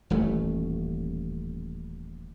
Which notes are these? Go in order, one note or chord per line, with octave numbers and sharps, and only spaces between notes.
D#1 A1 A3